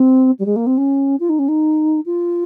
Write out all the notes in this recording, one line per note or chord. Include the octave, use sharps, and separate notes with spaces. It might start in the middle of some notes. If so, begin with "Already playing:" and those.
Already playing: C4
G3
G#3
A#3
C4
C#4
F4
D#4
C#4
D#4
F4